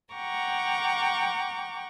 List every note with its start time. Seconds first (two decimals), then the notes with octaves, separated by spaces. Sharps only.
0.14 F#5 G5 A#5 C#6 D6